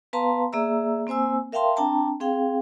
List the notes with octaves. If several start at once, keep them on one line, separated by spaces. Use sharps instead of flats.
B3 B4 F5 A5 A#5 C6
A#3 G#4 D5 E5 A#5 E6
A#3 C4 C5 G#5 E6
A#4 E5 F5 G5 A5 C6
C4 D4 G5 A5 A#5
C4 G#4 F5 G5